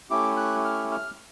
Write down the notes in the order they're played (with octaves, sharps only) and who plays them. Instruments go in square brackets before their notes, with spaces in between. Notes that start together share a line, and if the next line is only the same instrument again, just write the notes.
[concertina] A3 C#4 E4 G4 D6
F#6
F6
F6